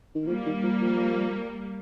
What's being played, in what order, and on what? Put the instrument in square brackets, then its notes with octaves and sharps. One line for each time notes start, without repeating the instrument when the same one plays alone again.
[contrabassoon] D#3
[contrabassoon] F3 [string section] G3 A#3
[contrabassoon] D#3
F3
F3